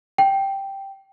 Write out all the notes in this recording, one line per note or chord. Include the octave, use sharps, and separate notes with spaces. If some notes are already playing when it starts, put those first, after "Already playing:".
G5